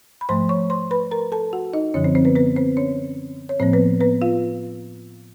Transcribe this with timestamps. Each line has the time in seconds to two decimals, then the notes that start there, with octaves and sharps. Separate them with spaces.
0.21 B5
0.29 G#2 F3 A3 C5 C6
0.49 C#5 C#6
0.70 C5 C6
0.91 B4 B5
1.11 A#4 A#5
1.32 A4 A5
1.53 F#4 F#5
1.73 D#4 D#5
1.94 F#2 D3 F3 C#4 C#5
2.04 C4 C5
2.15 C4 C5
2.25 B3 B4
2.35 B3 B4
2.56 C4 C5
2.77 C#4 C#5
3.49 C#5
3.60 A2 F3 A#3 C4 C5
3.73 B3 B4
4.01 B3 B4
4.22 F4 F5